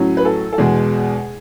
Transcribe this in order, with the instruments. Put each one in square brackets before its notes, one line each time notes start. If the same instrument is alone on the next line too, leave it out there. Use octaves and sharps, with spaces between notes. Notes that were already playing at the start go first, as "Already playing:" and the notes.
Already playing: [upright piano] A2 F#3 C#4
B4
A4
A4
E2 B2 G#3 G#4